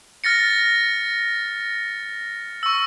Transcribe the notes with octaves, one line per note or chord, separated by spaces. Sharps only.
F6 A6 A#6 C#7
C#6 E6